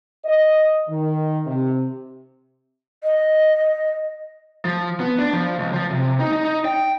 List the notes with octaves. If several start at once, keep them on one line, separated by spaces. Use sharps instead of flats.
D#5
D#3
C3
D#5
F3
B3
D4
F3
C#2
F3
C3
D#4
D#4
D#4
G5